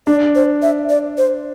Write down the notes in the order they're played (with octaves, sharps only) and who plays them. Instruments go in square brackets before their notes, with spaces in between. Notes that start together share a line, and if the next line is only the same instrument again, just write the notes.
[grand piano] D4 [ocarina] D5
[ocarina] C5
E5
D5
C5